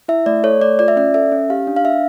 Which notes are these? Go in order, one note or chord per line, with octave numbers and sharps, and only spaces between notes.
E4 E5
A3 D5
A4 C#5
A3 D5
F4 D5
E5
C#4 D5
A4 E5
C#4
G4 F5
D4
F5
D4 E5